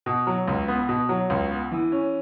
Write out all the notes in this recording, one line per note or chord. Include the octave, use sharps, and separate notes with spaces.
B2
F#3
C#2
B3
B2
F#3
C#2
B3
E3
C#4